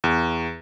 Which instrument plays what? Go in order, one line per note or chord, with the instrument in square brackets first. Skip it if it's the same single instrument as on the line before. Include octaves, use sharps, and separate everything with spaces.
[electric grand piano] E2